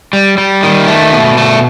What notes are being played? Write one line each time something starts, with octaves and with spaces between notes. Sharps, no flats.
G3
G3
D#3
A3
B2
A3